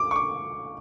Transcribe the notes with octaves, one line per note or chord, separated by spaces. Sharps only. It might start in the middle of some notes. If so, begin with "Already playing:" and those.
Already playing: D6
C#6
D6